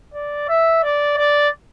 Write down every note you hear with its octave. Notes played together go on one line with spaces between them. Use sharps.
D5
E5
D5
D5